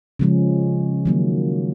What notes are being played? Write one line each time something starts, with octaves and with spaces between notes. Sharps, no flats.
C#3 F3 G#3 C#4
D#3 F#3 A#3